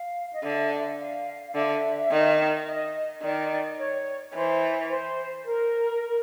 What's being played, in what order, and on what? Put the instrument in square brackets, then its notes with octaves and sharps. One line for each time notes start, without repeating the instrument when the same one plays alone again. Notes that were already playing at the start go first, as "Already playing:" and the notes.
Already playing: [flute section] F5
D#5
[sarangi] D3 [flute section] E5
[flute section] F5
F5
[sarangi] D3 [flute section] E5
[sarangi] D#3
[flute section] D#5
[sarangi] D#3 [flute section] D5
[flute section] C#5
[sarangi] E3 [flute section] C5
[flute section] C5
A#4